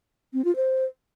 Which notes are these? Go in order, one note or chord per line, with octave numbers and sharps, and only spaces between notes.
C4
F4
C5